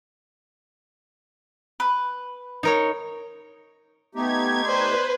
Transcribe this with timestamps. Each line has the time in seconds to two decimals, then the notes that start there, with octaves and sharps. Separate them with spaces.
1.80 B4
2.63 D#4 A#4 C#5
4.15 A3 B3 D#4 G4 G#6
4.65 B4 C5 D5